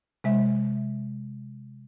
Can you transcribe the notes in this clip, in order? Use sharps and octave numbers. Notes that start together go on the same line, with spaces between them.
C3 G#3 E5